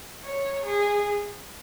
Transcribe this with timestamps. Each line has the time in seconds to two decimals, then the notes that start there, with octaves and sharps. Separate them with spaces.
0.24 C#5
0.66 G#4